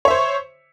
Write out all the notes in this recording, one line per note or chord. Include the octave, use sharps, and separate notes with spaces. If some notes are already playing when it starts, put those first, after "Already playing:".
C5 C#5 E5